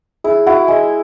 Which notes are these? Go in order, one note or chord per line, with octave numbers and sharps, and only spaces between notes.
E4 G#4
E4 F#4
G#3 G#4